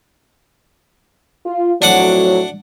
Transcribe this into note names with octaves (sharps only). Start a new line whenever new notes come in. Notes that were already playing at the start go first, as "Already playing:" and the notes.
F4
F2 A2 F#3 D4 F#5 D6